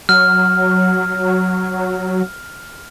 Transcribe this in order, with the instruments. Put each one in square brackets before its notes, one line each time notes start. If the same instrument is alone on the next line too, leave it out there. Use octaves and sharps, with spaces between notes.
[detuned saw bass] F#3 [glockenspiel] F6